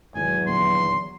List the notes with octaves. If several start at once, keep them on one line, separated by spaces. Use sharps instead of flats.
G#1 E2 B2 F#3 G#5
D#1 D3 B3 C6